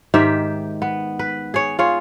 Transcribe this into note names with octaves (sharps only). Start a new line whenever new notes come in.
G#2 D#3 G4 E5
B3
B4
G#4 C#5
F4 G#4 C#5